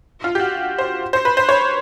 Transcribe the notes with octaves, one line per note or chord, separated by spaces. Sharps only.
F4
G4
F#4
C5
C5
B4
C5
C#5